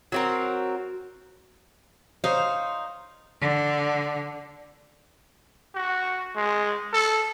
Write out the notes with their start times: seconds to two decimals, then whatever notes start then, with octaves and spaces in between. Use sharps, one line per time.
0.12 F#3 C4 A#4
2.24 D#4 C5 C#5 F5
3.41 D3
5.75 F#4
6.36 G#3
6.93 A4